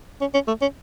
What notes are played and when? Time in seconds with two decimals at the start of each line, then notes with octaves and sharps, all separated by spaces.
0.21 C#4
0.34 C#4
0.47 A3
0.61 C#4